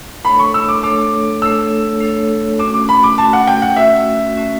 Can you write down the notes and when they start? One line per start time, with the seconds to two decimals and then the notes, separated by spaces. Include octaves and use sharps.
0.24 A3 D4 A4 C#5 B5
0.39 C#6
0.54 E6
0.68 D6
0.83 A3 D4 A4 C#5 D6
1.42 A3 D4 A4 C#5 E6
2.00 A3 D4 A4 C#5
2.59 A3 C#4 F#4 D6
2.74 D6
2.89 B5
3.03 D6
3.18 A3 C#4 F#4 A5
3.33 F#5
3.47 G5
3.62 F#5
3.76 A3 C#4 F#4 E5
4.35 A3 C#4 F#4